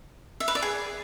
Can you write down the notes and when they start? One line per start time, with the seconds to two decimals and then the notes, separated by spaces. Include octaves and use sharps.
0.40 E5
0.48 B4
0.55 D5
0.62 G#4